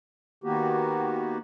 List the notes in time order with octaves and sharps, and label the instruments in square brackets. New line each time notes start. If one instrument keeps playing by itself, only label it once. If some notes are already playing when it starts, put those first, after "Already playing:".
[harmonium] D#3 A#3 B3 F#4 G4